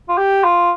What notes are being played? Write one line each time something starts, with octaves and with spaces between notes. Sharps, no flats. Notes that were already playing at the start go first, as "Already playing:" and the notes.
F4
G4
F4